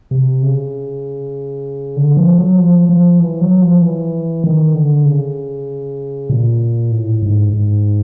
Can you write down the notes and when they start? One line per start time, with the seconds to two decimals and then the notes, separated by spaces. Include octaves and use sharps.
0.11 C3
0.43 C#3
1.96 D3
2.17 F3
2.38 F#3
2.58 F3
2.89 F3
3.20 E3
3.41 F#3
3.62 F3
3.82 E3
4.44 D#3
4.74 D3
5.06 C#3
6.30 A#2
6.92 A2
7.22 G#2
7.53 G#2